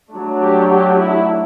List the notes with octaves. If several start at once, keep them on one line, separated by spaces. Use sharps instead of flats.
F#3 A3 D4
G4
G4
E4